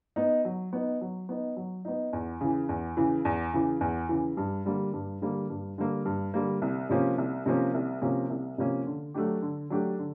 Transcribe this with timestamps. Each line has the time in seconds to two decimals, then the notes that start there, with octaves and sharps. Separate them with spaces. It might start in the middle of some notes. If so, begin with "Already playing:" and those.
0.16 B3 D#4
0.45 F#3
0.73 B3 D#4
1.01 F#3
1.29 B3 D#4
1.57 F#3
1.85 B3 D#4
2.13 E2
2.41 C#3 E3
2.69 E2
2.97 C#3 E3
3.25 E2
3.53 C#3 E3
3.81 E2
4.09 C#3 E3
4.37 G2
4.65 D3 G3 A#3
4.93 G2
5.22 D3 G3 A#3
5.50 G2
5.78 D3 G3 A#3
6.05 G2
6.34 D3 G3 A#3
6.62 C2
6.90 C3 F3 A#3 C#4
7.18 C2
7.46 C3 F3 A#3 C#4
7.74 C2
8.01 C3 F3 A#3 C#4
8.30 C2
8.58 C3 F3 A#3 C#4
8.86 D3
9.14 F#3 A3 D4 G4
9.42 D3
9.70 F#3 A3 D4 G4
9.99 D3